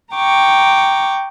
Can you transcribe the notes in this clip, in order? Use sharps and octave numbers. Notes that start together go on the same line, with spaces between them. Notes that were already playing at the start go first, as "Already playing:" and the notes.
G5 A#5 C#6 D6